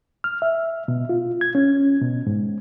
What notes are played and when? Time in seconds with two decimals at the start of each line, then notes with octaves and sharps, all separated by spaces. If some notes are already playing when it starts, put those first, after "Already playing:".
0.24 F6
0.42 E5
0.88 B2
1.09 F4
1.41 G#6
1.55 C#4
2.01 B2
2.27 G#2